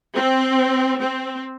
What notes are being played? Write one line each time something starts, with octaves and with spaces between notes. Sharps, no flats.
C4
C4